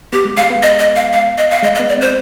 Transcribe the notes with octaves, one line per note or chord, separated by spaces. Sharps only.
B3 G4
G#3
G#3 F5
B3
D#5
D#5
F5
F5
D#5
F5
G#3 D#5
D#5
B3
D5
C4 C5